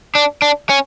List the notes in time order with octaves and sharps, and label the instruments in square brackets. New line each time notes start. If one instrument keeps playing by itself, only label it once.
[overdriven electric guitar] D4
D4
C#4